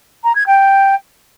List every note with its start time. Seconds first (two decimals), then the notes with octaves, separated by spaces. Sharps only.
0.24 A#5
0.35 G#6
0.47 G5